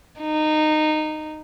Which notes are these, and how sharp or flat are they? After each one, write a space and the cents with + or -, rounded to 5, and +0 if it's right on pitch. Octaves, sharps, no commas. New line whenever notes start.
D#4 -15